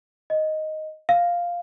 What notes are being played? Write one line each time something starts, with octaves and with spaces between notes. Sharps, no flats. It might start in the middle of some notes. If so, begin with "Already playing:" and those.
D#5
F5